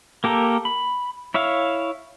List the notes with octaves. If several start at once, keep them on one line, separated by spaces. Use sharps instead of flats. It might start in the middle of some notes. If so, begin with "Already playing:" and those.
A#3 G4 A4 A#4
B5
E4 C#5 E5 F5